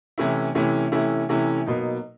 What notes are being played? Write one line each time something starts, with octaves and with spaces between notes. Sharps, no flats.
C3 E3 A3 C#4 E4
C3 E3 A3 C#4 E4
C3 E3 A3 C#4 E4
C3 E3 A3 C#4 E4
B2 F#3 A#3 D#4